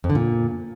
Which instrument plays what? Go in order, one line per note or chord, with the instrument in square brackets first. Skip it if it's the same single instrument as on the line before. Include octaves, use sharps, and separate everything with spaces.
[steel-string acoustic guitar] F2
D3
A#2